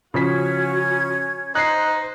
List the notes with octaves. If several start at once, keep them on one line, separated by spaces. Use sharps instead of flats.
C#3 F3 C#4 F#4 G#6 B6
D#4 C5 F#6 C7